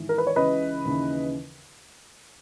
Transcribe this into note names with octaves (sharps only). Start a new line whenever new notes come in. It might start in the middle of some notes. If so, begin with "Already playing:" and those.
Already playing: G#1 G#2 E3
A#4
B4
C#5
C#2 C#3 E3 B4 D#5
D#2 C#3 E3